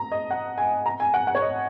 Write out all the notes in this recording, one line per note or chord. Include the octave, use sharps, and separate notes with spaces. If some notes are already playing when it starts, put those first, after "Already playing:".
Already playing: A#5
D#5
F#5
G#5
A#5
G#5
F#5
F#5
C#5
D#5